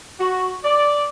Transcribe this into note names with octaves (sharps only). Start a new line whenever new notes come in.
F#4
D5